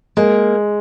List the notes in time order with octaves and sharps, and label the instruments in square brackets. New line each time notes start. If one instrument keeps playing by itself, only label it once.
[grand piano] G#3 [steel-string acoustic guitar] A#3